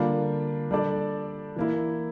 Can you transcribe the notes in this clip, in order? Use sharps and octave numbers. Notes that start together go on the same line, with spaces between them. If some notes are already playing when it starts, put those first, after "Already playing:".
Already playing: D3 G3 A#3 D4 F4
G3 D4 A4 D5
E3 A#3 E4